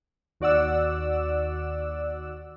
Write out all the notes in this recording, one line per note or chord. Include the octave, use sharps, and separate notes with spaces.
D#2 F#4 D5 F#5 E6